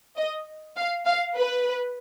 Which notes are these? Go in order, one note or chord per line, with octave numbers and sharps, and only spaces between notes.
D#5
F5
F5
B4